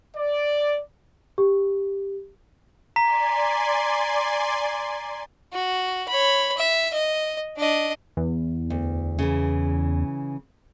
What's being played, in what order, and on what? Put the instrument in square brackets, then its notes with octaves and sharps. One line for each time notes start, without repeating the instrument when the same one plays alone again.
[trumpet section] D5
[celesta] G4
[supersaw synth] D5 G#5 C6 [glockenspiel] A#5 B6
[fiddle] F#4
C#5 B5
E5
D#5
D4 D#5
[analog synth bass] E2
[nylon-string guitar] D2
C#3 E3